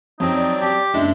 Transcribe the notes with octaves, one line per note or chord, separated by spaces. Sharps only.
F2 F#3 C4 D#4
D5
G4 A5
F#1 G#3 D4 E5